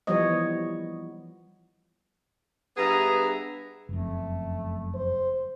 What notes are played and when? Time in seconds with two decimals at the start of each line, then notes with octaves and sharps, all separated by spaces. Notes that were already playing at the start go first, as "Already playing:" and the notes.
0.07 E3 F3 G3 B3 C#5 D#5
2.77 G2 B3 G#4 E5 A#5
3.89 F#1 F2 A3
4.95 C5